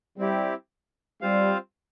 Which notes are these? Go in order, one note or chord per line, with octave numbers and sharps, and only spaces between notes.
G3 C4 E4 G4
G3 C4 F4 C5 F5